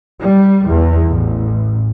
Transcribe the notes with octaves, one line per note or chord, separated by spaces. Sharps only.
G3
E2
A1